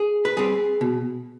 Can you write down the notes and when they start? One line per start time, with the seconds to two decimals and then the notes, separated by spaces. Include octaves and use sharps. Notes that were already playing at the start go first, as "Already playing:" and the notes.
Already playing: G#4
0.25 B4
0.37 G3 C4 G#4
0.81 B2